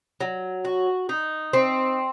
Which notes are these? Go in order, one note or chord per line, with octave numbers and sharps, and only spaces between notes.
F#3
F#4
D#4
C4